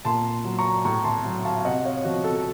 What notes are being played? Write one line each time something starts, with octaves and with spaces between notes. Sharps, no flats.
A#2 A5 C6
F#3
A#5 C#6
A2 A#5 C#6
A5 C6
F#3
F5 A5
F5
C3 D#5 F#5
C#5 F5
F3 F#4
A4